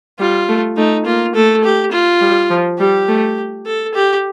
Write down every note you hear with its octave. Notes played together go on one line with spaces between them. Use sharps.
G3 F4
A3
A3 D#4
A#3 F4
A3 A4
G4
F4
G3
F3
G3 G4
A3
A4
G4